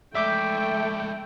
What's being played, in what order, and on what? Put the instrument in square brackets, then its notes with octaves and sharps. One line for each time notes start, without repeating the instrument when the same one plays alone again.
[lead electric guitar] G#3 D5 [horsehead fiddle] A3 G5 [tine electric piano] E5 D6 G6